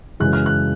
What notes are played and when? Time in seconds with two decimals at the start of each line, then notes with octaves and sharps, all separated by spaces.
0.20 F#2 C#3 E3 G#3 F#6
0.33 F6
0.46 F#6